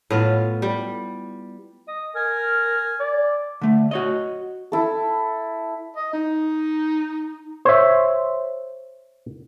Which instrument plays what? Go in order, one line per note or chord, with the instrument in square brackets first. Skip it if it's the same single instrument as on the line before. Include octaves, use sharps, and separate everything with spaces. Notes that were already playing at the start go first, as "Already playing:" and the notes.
[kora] A2 B3 F4
G3
[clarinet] D#5
[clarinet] A#4 [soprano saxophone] G#5
[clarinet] D5
[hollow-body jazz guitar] D3 A3
F#4 C#5 D#5
[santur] E4 A4
[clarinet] D#5
D#4
[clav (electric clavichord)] C5 C#5 E5